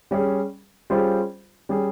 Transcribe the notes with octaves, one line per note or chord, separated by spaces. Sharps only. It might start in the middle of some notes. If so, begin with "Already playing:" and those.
G3 C#4 G#4
G3 C#4 F4 G#4 C5
G3 C#4 G#4